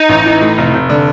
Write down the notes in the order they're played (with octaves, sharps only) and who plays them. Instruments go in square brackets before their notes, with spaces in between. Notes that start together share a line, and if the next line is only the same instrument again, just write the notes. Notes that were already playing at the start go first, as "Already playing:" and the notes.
Already playing: [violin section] D#4
[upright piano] A1
E3
A2
F1
F1
D3